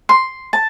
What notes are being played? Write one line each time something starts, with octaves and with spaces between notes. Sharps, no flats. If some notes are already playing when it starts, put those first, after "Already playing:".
C6
A5